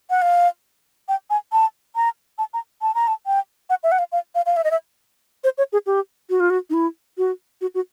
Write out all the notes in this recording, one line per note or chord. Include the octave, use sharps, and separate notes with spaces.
F#5
F5
G5
G#5
A5
A#5
A5
A#5
A5
A#5
A5
G5
F#5
E5
F#5
F5
F5
F5
F5
E5
D#5
E5
C5
C#5
G#4
G4
F#4
F4
F#4
D#4
E4
F#4
F#4
F#4